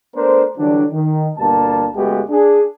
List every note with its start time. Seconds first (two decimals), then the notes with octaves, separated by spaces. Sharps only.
0.15 A3 B3 D4 A#4 C5
0.57 D3 E3 F#3 G3 D4
0.92 D#3
1.37 G1 B2 G3 A#3 A5
1.95 F#1 G#3 A3 B3 F#4 G4
2.30 D4 G#4